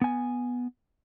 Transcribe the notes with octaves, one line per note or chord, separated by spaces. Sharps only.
B3 G#5